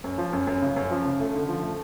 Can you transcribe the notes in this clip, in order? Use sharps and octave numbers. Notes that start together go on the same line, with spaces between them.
F#2
F3
F#2
F#2
C#3
F#2
F3
C#3
A3
D3
F3
A3